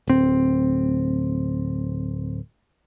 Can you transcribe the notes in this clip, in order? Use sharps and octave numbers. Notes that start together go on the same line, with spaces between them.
D1 C4